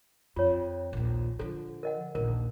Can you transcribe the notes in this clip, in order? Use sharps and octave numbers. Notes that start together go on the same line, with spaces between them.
F2 F4 C#5
A#1 D#2
D3 F3 A4
A#4 D#5 F#5
A#1 D#2 A#4